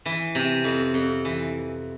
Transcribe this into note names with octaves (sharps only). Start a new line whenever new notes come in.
E3
C3
F2
F2
E3